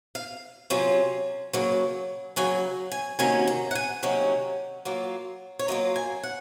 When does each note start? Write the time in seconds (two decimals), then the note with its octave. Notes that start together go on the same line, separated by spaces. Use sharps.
0.15 F5
0.70 C3 F#3 C#4 F4
1.53 C#3 F#3 A#3
2.36 C#3 F#3 A#3 G#5
2.92 G#5
3.19 C3 D#3 F#3 A#3 C#4 G#5
3.47 A#5
3.71 F#5
3.75 G#5
4.03 C3 D#3 F#3 A#3 C#4
4.85 F#3 A#3 F4
5.59 C#5
5.68 F#3 A#3 F4 D#5
5.96 G#5
6.23 F#5